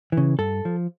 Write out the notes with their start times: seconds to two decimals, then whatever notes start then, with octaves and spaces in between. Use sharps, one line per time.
0.12 E3
0.17 C#3
0.39 G2 A4
0.65 F3